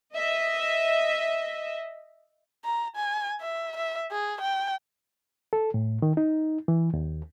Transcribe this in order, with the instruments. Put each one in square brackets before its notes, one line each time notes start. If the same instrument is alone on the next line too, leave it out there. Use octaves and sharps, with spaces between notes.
[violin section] D#5 E5
[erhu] A#5
G#5
E5
E5
G#4
G5
[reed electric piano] A4
A2
D#3
D#4
E3
D#2